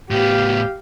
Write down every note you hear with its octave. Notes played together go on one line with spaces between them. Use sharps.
A2 B3 G4 F5